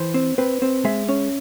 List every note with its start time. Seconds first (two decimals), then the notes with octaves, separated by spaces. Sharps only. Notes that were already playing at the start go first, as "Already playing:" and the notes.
Already playing: E3 C5
0.14 C4
0.38 C4 B4
0.62 C4
0.85 G#3 E5
1.09 C#4